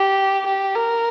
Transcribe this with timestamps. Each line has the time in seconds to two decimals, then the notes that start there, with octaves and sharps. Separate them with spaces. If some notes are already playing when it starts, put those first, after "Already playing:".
Already playing: G4
0.46 G4
0.75 A#4